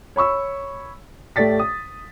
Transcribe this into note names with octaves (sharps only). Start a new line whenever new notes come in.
C#5 B5 C#6 E6
A2 A3 G4 D5 A6 B6
D#6